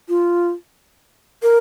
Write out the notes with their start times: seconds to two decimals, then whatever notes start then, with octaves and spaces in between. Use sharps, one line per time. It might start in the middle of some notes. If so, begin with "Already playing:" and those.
0.09 F4
1.43 A#4